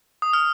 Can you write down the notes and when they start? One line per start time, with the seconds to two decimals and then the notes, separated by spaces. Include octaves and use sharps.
0.22 D#6
0.33 F6